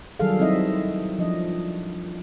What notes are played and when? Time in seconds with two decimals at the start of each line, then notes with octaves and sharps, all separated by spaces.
0.20 D#3 F#3 G3 G#4 A4 F5
0.39 F#3 C4 D#4 E4 D#5 E5
1.18 F3 D4 D#5